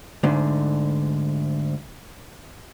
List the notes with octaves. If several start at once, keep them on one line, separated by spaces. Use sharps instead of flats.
D2 G#2 D3